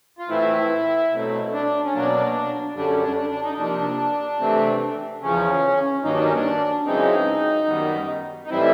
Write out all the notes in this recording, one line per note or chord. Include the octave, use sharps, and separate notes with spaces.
F4
A2 E3 A3 C4 E4
B2 F#3 A3 C4
D4
C#4
B2 F#3 A#3 D4
F#2 D3 G3 D4
C#4
D4
D4
D4
D#4
C3 F3 A#3 D4
C3 E3 A3 C4
E2 C#3 F3 C#4
G2 D#3 F#3 A#3 D#4
D4
C#4
D4
F#2 C#3 E3 G#3 C4 D#4
F#2 D#3 G3 B3
D#4
A2 E3 G3 C4 E4